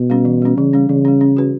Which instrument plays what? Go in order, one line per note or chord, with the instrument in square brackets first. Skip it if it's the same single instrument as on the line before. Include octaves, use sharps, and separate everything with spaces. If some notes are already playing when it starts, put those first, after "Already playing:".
Already playing: [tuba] B2
[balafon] G3 C#4
E3
G3 C#4
[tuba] C#3 [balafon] E3
[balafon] G3 C#4
[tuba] C#3 [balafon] E3
[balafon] G3 C#4
C#4
F#4 B4